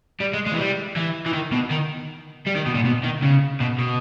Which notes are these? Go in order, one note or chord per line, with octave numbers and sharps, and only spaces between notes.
G3
G#3
G#3
E3
G3
E3
E3
D#3
B2
D#3
G3
D#3
B2
A#2
B2
D#3
C#3
B2
B2